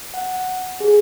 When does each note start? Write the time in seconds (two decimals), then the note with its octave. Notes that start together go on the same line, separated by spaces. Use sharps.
0.14 F#5
0.80 G#4